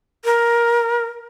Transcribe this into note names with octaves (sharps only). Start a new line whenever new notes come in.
A#4